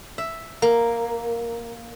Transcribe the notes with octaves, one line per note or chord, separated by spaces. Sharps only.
E5
A#3